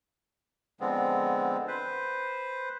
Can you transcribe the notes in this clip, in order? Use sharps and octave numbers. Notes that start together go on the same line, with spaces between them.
D3 F3 G#3 B3 C4
B4 C5